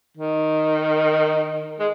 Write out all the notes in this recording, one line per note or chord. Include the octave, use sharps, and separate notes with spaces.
D#3
G#3